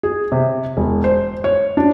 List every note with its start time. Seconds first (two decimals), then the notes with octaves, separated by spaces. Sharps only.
0.03 G#4
0.32 C3
0.77 E1
1.04 C5
1.44 C#5
1.77 D4